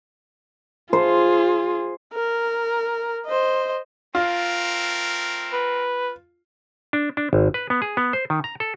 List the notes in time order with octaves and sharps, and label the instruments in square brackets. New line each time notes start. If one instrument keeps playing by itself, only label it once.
[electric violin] F4 G#4 [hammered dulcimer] C5
[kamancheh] A#4
C5 D#5
[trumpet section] A3 C4 A#4 [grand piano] F4
[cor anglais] B4
[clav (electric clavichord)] D4
D4
G#1
B4
B3
G#4
B3
C5
D#3
A#5
A4